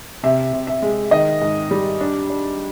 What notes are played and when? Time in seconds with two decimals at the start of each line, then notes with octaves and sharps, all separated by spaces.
0.23 C3 E5
0.53 C3
0.67 E5
0.82 G#3
1.11 D#3 D#5
1.42 G#2
1.71 G3
2.01 D4
2.30 D4